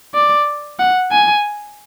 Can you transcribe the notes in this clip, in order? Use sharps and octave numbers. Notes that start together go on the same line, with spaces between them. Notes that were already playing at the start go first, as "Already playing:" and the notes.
D5
F#5
G#5